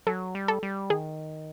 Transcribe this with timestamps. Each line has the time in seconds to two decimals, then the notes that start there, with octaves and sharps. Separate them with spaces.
0.07 F#3 A4
0.35 G3
0.48 A4
0.63 G3
0.90 D#3 G#4